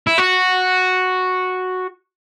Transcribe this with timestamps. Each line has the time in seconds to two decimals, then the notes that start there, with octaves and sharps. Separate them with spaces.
0.07 E4
0.18 F#4